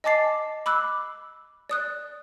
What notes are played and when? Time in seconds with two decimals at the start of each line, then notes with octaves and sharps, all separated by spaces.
0.04 D#5 G#5 A5 D6 A6 C7
0.66 B5 D6 E6 F#6
1.70 D5 D#6 F#6